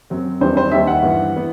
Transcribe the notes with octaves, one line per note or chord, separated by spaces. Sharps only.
F#2 F#3 C4
E2 D#3 G3 C4 C5
C5
D#2 D#3 G3 E5
F#5
G2 E3 B3
E3 B3